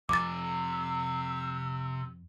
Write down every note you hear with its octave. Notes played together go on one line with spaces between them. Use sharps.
F2 C3 G#5 D6 E6 A6